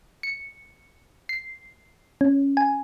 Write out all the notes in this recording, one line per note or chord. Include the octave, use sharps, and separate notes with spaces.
C#7
C7
C#4
G#5